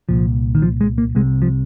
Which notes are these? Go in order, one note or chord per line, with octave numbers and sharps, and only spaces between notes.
C2 A#2 F3
D#3
F3
G#3
A#3
C2 C3 G#3
F3